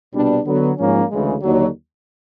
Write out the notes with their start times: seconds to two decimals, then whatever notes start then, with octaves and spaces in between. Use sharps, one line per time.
0.14 C2 B2 G3 B3 D4
0.45 D3 F#3 B3
0.78 G#2 F3 A#3 C#4
1.10 D2 C#3 E3 G#3
1.42 D#2 D3 F#3